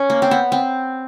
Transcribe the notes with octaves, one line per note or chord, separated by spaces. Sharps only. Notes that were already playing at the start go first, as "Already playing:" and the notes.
Already playing: C#4
A#3
C4
B3
C4